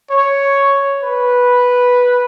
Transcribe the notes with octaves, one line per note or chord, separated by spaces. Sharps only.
C#5
B4